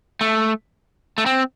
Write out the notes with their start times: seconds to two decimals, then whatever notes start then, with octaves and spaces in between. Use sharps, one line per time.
0.21 A3
1.18 A3
1.26 C4